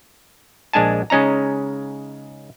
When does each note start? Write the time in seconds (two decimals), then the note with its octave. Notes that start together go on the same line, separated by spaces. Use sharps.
0.73 A#1 G#3 D4 G#5 A5
1.10 C#3 G#3 C#4 D#4 A#5